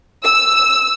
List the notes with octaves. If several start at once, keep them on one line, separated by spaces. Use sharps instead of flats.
E6